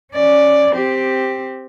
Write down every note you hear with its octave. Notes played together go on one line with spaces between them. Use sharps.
C#4 D5
C4 G4